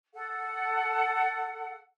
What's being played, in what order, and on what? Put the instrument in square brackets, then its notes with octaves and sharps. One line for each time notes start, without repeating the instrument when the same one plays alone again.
[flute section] A4 F#5